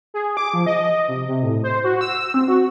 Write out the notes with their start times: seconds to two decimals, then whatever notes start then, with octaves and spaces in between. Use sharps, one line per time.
0.14 G#4
0.37 D6
0.54 F3
0.66 D#5
1.08 C3
1.28 C3
1.43 A2
1.64 C5
1.84 F#4
2.01 E6
2.34 C4
2.48 F#4